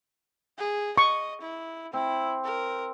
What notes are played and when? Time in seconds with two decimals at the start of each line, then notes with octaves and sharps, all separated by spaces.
0.58 G#4
0.98 D#5 C#6
1.42 E4
1.93 C4 E4
2.44 A#4